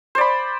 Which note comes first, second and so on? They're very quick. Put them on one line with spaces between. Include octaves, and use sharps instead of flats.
C5 D5 B5